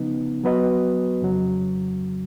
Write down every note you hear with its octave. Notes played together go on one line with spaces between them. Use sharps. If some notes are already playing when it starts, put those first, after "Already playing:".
Already playing: C#3 F3 B3 D#4
F#3 B3 F#4 B4 D#5
F2 C#3 F#3